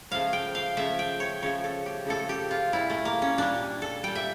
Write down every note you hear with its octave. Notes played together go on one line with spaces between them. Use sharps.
C#3 F3 A3 F5
G5
F5
C#3 F3 A3 E5
G5
C#5
C#3 F3 A3 C#5
A4
G4
C#3 F3 A3 A4
G4
F4
A#2 G3 E4
A3
A#3
C#4
A#2 G3 D4
A4
A#2 G3 G5
E5